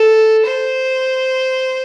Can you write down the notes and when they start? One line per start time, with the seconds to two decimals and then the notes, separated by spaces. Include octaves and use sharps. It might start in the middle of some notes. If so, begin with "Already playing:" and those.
Already playing: A4
0.47 C5